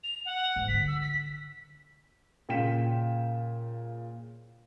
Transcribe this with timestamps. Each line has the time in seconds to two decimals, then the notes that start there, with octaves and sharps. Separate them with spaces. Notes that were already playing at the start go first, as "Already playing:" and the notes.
0.03 F7
0.25 F#5
0.56 G#2
0.68 D3 B6
0.87 E6
1.01 B6
2.49 A#2 C#3 G5 B6 E7